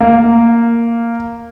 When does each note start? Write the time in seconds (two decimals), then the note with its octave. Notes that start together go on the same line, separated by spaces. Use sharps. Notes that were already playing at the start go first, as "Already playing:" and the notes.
0.01 A#3